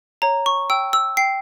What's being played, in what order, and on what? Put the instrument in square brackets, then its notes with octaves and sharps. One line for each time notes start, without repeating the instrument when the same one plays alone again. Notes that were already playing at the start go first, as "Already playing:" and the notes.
[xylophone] C#5 A#5
C#6
G5 E6
E6
G5 C7